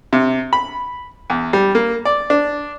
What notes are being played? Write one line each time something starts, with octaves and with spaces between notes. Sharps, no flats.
C3
B5
E2
G3
A#3
D5
D4